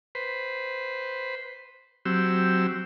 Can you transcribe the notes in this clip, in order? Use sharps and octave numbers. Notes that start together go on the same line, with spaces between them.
B4 C5
F#3 C4 G4 E6